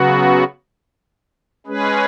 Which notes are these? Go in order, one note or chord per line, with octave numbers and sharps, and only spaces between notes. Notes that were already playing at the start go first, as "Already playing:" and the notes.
Already playing: C#3 F#3 B3 F#4
G#3 C#4 G#4 B4